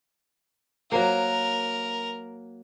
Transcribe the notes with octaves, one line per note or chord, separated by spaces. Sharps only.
F#3 A#3 A#4